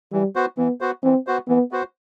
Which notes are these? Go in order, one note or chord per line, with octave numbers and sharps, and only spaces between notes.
E3 G3
B3 F#4 C5
E3 B3
B3 F#4 C5
E3 C4
B3 F#4 C5
E3 B3
B3 F#4 C5